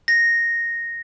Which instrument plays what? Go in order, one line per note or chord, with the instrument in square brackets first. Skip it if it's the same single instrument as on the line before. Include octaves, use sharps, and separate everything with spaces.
[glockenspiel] A#6